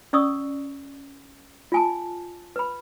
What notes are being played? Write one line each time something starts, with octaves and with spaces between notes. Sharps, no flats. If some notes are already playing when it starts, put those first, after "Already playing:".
C#4 D5 C#6 D#6 E6
F4 G#5 A5
B4 B5